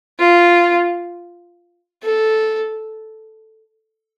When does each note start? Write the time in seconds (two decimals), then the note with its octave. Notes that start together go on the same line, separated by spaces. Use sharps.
0.19 F4
2.03 A4